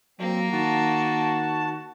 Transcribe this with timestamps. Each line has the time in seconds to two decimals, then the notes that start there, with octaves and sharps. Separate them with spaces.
0.19 F#3 A#3 C4
0.53 D#3 F#4 A5